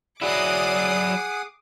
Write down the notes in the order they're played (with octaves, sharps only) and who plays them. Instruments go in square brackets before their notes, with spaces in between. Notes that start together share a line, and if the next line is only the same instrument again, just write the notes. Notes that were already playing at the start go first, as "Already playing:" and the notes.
[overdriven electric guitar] F#3 E4 [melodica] G#4 F#5 [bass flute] D5 [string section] D6 D#6 C7